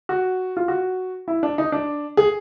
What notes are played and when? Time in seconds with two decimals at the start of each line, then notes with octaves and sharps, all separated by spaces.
0.09 F#4
0.57 F4
0.68 F#4
1.28 E4
1.43 D4
1.58 D#4
1.72 D4
2.17 G#4